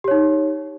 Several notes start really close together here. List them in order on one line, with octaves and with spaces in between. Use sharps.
G4 C#5 D#4